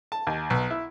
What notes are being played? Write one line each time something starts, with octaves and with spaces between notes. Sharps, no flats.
A5
D#2
B1
E4